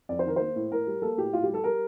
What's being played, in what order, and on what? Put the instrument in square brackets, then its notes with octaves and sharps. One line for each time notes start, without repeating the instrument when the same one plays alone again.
[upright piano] F2 D5
C5
D#3 A#4
A#3 C5
A2
A2 A#4
G3
A#3 A4
A2 G4
A2 F4
G4
G3 A4
G3 A#4